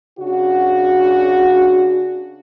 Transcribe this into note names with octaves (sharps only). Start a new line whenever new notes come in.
C#3 D4 F#4